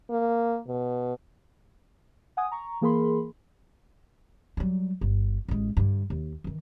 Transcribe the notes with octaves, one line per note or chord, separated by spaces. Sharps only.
A#3
B2
F#5 G#5 D#6
A#5 C#6
E3 A#3 G#4 A#4 B5 C6
F#3 G3
G1
A1 G#3
G2 D3
D#2
D#3 E3